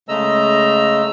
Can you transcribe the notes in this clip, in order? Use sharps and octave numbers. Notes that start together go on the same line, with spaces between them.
C#3 G#3 A3 D#5 A#5 E6